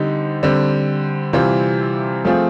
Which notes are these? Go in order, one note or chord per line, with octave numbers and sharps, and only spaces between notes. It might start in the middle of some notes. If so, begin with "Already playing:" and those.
Already playing: D3 G3 C4 D#4 G4
D3 G3 C4
C3 E3 G3 C4 F4
F3 A3 C4 F4 G#4